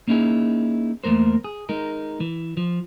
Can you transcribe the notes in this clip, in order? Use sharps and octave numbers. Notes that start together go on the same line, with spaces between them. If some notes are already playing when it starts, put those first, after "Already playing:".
A#3 C#4 D#4 E4 G#4
E2 A3 A#3 A#4 C5
G#4
G#3 D#4 A#4
E3
F3